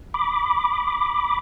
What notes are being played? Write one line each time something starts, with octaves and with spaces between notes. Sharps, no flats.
B5 D6